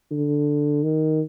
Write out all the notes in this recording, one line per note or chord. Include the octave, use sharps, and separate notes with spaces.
D3
D#3